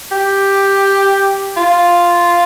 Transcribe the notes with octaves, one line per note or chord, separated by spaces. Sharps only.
G4
F4